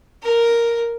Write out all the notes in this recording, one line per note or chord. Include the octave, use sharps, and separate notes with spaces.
A#4